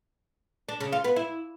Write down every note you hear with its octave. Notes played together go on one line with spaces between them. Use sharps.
D4
C#3
F4
B3
E4